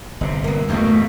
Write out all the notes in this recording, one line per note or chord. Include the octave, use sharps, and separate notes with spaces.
G1 C3
A#3 B3
E2 G2 B2 A3 A#3